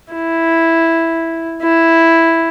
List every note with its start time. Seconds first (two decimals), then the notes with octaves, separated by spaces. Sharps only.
0.13 E4
1.63 E4